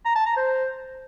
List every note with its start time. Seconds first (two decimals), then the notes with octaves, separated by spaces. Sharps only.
0.05 A#5
0.16 A5
0.26 A#5
0.37 C5